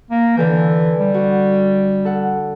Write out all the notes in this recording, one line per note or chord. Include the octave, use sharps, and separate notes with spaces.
A#3
D3 E3 A4 G6
G3
F#4
A4 F#5